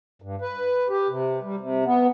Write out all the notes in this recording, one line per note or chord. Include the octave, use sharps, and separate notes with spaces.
G2
B4
G4
C3
G3
C3
B3